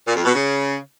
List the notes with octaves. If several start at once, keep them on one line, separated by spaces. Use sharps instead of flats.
A#2
F2
B2
C#3